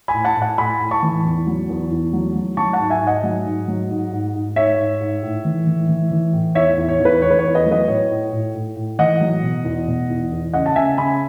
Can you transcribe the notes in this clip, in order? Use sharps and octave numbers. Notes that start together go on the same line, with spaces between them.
G#5 B5
A2
F#5 A5
A2
F#5 A5
A2 G#5 B5
A2
A5 C#6
E3
E2
F#3
E2
E2
F#3
F#3
F#3 A5 C#6
F#5 A5
G#2
E5 G#5
G#2
D#5 F#5
F#3
G#2
F#3
G#2
G#2
G#2
G#2 C#5 E5
G#2
G#2
A2
E3
E3
E3
E3
A2
E2 C#5 E5
E2
C#5
E2
B4
E2 C#5
B4
C#5
E2
B4 D#5
F#3
B4 D#5
A2 C#5
A2
A2
A2
A2
E3 D#5 F#5
F#3
B2
E2
B2
E2
E2
C#3 D#5 F#5
A5
C#3 E5 G#5
C#3 G#5 B5